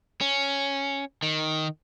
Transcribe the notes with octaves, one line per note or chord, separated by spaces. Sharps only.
C#4
D#3